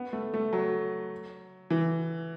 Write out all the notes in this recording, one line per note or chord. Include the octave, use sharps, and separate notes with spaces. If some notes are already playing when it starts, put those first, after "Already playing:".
Already playing: B3
A3
A3
F#3
E3